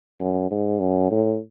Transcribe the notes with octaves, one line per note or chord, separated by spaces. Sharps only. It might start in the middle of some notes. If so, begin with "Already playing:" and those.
F#2
G#2
F#2
A2